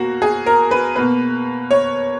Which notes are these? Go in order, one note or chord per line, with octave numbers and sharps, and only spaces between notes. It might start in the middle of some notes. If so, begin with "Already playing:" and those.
Already playing: B2 A#3 F#4
G#4
A#4
B4
B2 A#3 B4
C#5